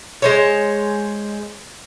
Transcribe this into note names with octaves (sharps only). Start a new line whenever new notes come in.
G#3 C5 C#5